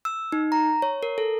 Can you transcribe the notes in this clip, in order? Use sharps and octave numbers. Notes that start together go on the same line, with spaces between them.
E6
D#4
A#5
C#5
A#4
A4